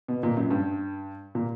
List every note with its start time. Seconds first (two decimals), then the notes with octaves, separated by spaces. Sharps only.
0.08 B2
0.23 A#2
0.37 F#2
0.51 G2
1.35 A#2